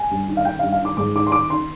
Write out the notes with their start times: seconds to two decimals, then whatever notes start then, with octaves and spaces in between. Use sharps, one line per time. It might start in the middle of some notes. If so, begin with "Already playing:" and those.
Already playing: G#5
0.11 G2
0.28 D#3
0.37 F5
0.45 D#3 G5
0.59 G2 F5
0.72 F5
0.81 D#3 D6
0.97 G#2 D6
1.15 D#3 D6
1.27 C6
1.32 D#3 D6
1.49 D#3 C6